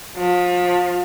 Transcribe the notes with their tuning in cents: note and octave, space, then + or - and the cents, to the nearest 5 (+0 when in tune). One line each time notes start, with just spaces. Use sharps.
F3 +30